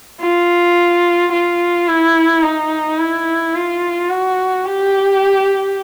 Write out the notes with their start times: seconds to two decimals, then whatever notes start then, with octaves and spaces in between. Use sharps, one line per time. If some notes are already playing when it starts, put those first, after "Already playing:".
0.21 F4
1.32 F4
1.87 E4
2.43 D#4
2.99 E4
3.54 F4
4.09 F#4
4.66 G4